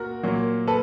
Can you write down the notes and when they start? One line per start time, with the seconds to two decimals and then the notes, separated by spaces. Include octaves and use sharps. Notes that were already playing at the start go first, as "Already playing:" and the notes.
Already playing: A#2 F#4 A#4
0.23 A#2 F#3 A#3
0.67 A4 B4